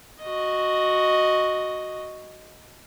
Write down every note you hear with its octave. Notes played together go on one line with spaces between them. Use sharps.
F#4 D#5